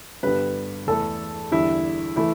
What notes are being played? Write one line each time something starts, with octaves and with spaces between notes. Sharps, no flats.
G2 D3 G3 B3 B4
E2 E3 A3 A4
E2 D3 G3 E4
E3 A3 E4